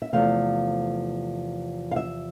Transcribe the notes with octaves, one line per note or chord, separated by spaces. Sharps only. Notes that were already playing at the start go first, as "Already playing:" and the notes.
E5
E2 C3 F3 A3 F5
F5
E5